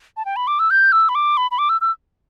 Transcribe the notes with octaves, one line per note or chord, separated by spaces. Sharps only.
A5
G5
B5
D6
E6
G6
E6
B5
D6
B5
B5
D6
E6
E6